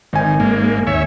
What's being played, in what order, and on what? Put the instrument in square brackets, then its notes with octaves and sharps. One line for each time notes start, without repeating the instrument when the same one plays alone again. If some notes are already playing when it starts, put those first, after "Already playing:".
[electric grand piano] G#1 G#5 [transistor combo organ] D#3
[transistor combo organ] G#2 A#3
D#2 C#5 E5